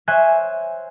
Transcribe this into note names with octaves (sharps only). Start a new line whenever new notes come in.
C5 C#5 E5 G#5 F#6 G#6